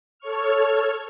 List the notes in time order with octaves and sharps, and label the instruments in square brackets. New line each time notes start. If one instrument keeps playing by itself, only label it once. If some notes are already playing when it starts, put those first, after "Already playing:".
[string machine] A4 C#5 C#6 F6